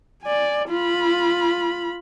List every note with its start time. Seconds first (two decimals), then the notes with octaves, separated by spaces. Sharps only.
0.23 D5 G#5
0.69 F4 B5